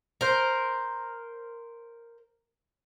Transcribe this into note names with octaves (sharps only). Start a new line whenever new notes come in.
A#4 C5